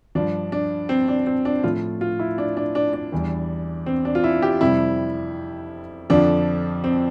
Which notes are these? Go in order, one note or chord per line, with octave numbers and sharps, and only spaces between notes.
G2 F3 D4
D4
C4
D4
C4
D4
A2 F3 F4
F4
E4
D4
D4
D4
D4
E2 E3 G3
C4
D4
F4
E4
G4
F2 C3 G3 E4
F2 D3 F3 D4
C4